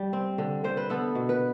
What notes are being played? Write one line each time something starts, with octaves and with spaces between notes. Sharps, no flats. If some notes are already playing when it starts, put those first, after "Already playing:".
Already playing: G3
C4
D3
D3 C5
B4
B3 A4
B2
B4